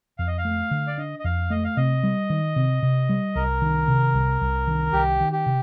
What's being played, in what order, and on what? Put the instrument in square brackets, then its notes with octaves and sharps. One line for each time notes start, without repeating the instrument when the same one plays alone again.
[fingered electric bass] F2 [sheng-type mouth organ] F5
[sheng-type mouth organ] D#5
F5
[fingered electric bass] A3
D3
[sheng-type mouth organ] D5
[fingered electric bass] D4 [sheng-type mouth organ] D#5
[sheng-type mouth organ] D#5
[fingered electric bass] F2 [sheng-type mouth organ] F5
[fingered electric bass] A3 [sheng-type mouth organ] D#5
[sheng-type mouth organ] F5
[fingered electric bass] C3 [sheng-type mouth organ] D#5
[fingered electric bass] G3
D#3
C3
C3
G3
[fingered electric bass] C2 [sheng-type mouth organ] A#4
[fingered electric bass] D#3
C3
C2
C2
D#3
[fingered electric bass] C2 [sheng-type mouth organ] G4
[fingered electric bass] D#3
[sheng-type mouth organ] G4
[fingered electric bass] C3